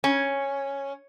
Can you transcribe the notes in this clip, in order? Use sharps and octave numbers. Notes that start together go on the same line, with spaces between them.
C#4